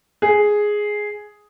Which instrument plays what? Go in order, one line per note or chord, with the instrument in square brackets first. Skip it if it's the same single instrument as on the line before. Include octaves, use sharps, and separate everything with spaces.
[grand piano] G#4